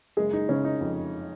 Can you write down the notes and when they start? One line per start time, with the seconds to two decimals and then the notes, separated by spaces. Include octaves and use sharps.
0.17 F#1 G#3 G#4
0.33 D#4
0.49 C#3 C#4
0.64 D#4
0.81 F2